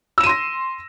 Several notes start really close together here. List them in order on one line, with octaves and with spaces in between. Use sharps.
E6 E7 D#7 C6 A#6